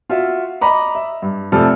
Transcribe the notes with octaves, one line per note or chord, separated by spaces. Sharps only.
F4 F#4 E5
D#5 A#5 B5 D6
E5
G2
F1 C3 F3 A4 F6